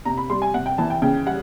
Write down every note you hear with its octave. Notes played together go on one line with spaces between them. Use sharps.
C3 A#5
B5
G3 C6
G#5
C3 F#5
G5
E3 A5
G5
C#3 G5
G3 F#5